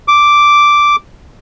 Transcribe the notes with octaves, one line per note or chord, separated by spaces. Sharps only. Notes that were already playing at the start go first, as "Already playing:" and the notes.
D6